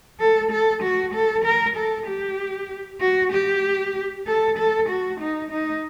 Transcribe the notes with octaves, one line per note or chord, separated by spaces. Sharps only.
A4
A4
F#4
A4
A#4
A4
G4
F#4
G4
A4
A4
F#4
D#4
D#4